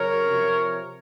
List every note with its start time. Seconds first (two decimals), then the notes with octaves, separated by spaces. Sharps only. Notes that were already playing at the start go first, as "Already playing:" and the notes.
Already playing: C#3 F#3 A#4 C#5
0.26 C3 F3